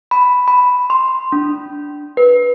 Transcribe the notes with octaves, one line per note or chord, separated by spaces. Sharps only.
B5
B5
C6
D4
B4